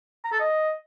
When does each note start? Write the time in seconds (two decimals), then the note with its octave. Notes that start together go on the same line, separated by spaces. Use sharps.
0.24 A#5
0.32 A4
0.40 D#5